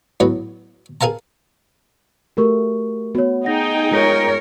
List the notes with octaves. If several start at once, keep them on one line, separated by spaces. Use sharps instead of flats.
A2 F#3 B3
G#4 A#4 F5 A5 A#5
A3 F#4 G4 A#4 C#6
B3 F#4 C#5
D#4 G#4 F#5 G5 A#6
G#3 F4 A#4 C#5